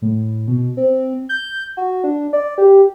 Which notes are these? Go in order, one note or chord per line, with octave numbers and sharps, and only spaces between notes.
A2
B2
C4
G6
F#4
D4
D5
G4